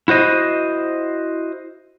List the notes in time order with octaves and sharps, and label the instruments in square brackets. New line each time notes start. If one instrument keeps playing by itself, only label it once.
[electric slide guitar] E4 F#4 C5 D#5